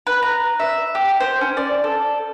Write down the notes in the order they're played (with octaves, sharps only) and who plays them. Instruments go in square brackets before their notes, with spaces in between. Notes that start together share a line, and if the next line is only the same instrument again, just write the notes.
[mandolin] B4
A#5
E5
G4
C5
C#4
D5
A4